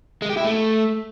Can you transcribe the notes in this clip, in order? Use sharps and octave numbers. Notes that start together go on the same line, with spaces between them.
G#3
G4
E4
A3